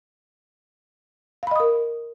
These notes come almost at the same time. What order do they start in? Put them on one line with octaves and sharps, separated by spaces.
F5 B5 D#5 D#6 A#4